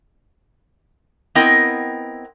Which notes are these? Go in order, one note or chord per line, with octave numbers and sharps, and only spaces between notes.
B3 C4 E4 A#4 D#5 G5